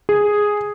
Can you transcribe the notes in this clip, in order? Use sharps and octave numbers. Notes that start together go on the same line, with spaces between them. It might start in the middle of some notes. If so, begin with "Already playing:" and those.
G#4